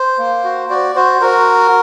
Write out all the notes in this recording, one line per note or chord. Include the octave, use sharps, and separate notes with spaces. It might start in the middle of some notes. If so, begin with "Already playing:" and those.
Already playing: C5
A#3
F#4
F#4 D5
F#4 C5
F#4 A#4